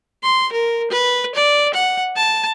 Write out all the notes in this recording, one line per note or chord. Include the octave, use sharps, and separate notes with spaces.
C6
A#4
B4
D5
F#5
A5